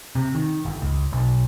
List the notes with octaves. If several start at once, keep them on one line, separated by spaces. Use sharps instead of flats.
C3
D#3
G1
C#2
B1